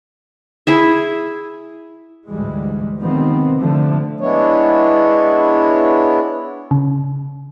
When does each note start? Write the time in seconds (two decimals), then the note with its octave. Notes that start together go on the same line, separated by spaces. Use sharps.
0.67 E4 G#4 E5
2.28 D2 G#2 E3 G3 G#3
3.01 C3 D#3 F3 B3 C4
3.58 D3 F3 A3
4.21 G#3 B3 D4 E4 C#5
6.71 C#3